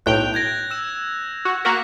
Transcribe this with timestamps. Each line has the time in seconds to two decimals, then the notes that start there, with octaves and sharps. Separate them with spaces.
0.06 B1 A2 G5 F#6 F7
0.34 G6 G#6 A#6
0.71 E6 E7
1.45 F#4
1.65 A#3 F#4 A#4 B6